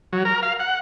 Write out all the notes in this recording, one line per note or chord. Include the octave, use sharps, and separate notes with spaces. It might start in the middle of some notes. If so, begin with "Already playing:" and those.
F#3
A#4
F5
F#5